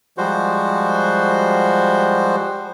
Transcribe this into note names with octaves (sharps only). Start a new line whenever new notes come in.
F3 G3 G#3 F#4 C5